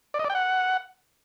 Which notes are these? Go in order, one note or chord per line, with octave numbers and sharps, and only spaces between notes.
D5
D#5
D5
G5
F#5